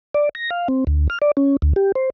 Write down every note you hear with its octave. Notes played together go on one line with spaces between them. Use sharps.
D5
A#6
F5
C4
D2
F6
D5
C#4
D2
G4
C5